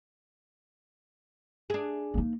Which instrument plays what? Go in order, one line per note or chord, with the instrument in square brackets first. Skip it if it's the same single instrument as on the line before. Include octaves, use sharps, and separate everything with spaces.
[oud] D4 G#4
[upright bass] A#3 D#4